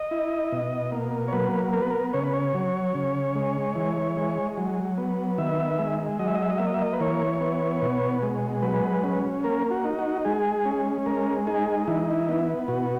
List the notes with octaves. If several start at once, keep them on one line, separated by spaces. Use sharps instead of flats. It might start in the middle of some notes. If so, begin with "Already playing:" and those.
Already playing: D#5
E4
B2
A#3
C#5
F#3 B4
B3 A#4
B4
A#4
C#3 C#5
B4
C#5
F#3
C#3
G#3
E3
G#3
F#3
B3
D#3 E5
G#3
F#3 D#5
E5
D#5
E5
D#5
A#3 E5
D#5
E5
D#5
B4
E3 C#5
B3
B2
G#3
F#3 B4
C#4
A#3 A#4
F#4
D#4
F#4
G#3 G#4
C#4
G#3 A#4
D#4 G#4
E3 E4
E4
B3
B2 F#4